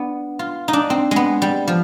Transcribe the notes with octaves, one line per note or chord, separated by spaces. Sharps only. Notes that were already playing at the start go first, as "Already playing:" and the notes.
Already playing: B3 D4
F4
D#4
D4
C4
G#3 B3
G3
F3